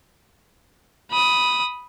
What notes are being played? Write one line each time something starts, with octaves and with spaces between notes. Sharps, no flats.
B5 D#6